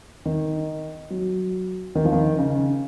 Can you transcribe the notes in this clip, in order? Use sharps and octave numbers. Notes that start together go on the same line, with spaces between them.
D#3
F#3
D#3
F3
D#3
C#3